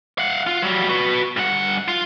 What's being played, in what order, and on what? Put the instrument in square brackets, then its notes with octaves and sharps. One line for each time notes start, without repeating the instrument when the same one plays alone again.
[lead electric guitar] F5 F#5
F4
F#3 G3
F#4 B4
G2 F#5
F4